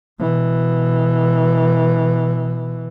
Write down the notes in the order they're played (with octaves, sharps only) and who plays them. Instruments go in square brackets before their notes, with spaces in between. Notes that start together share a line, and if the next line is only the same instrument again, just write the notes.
[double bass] B2 E3